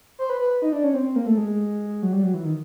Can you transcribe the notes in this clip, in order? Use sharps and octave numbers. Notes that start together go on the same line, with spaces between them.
C5
B4
B4
D#4
D4
C#4
C4
C4
A#3
A3
G#3
F#3
G3
F#3
E3
D#3